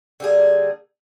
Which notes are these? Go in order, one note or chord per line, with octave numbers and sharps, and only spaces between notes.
D3 G3 A#3 G#4